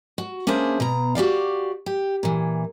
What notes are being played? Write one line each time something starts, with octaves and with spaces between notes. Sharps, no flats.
F#4
A#3 C#4 D4 G#4 C5 E5
B2 A#5
F#4 G4 D5 F5
G4
A#2 E3